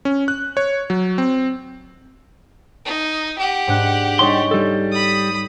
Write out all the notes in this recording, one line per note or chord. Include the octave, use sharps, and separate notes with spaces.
C#4
F#6
C#5
F#3
C4
D#4
G4 F#5
G#2 D4 F#6
G3 D#4 G#4 C#5 C6
G3 A4
B5 D#6